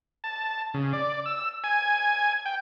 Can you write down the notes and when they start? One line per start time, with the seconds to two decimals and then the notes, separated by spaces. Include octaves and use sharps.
0.24 A5
0.74 C#3
0.93 D5
1.26 E6
1.64 G#5
2.46 G5